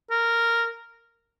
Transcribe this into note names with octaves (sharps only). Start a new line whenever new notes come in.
A#4